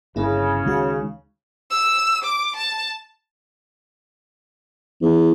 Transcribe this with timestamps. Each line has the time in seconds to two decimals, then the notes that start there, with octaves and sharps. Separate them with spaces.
0.16 G1 C#3 A#3 E4
0.66 D2 D#3 G#3 F#4 F5
1.70 E6
2.24 D6
2.56 A5
5.02 E2